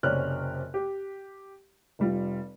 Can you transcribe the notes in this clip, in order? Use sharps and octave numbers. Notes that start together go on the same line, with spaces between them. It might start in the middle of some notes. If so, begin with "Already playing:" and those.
F#1 C3 C#4 D5 F6 F#6
G4
F1 G3 F4